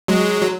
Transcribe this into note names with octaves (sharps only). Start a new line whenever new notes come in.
F#3 G#3
F#3